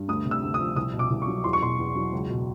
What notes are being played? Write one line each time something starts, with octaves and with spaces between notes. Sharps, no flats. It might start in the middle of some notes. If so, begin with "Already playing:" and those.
Already playing: G2
D2 D#6
C3
E6
D2
D#6
F3
C2 D#6
B2
D6
C2
C#6
F#3
E2 C6
C#6
B2 C6
E2
F#3
C#2
B2